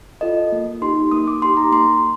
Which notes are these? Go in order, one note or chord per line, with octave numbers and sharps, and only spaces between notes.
F4 A4 D#5
A#3
D#4 G4 C6
A#3 D#6
D6
D#4 G4 C6
A#5
A#3 C6